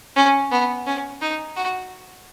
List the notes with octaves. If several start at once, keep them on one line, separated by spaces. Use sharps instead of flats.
C#4
B3
C#4
D#4
F#4